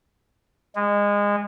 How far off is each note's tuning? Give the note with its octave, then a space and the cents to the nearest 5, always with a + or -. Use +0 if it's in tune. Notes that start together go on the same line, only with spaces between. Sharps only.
G#3 -25